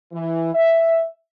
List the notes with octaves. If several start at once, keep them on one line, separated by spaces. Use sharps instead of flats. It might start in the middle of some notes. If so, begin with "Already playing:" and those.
E3
E5